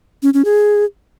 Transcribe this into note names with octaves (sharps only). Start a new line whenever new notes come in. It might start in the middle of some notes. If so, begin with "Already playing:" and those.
C#4
C#4
G#4